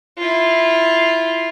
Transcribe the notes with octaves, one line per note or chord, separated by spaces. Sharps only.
E4 F4